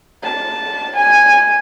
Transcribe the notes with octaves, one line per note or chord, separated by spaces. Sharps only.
A5
G#5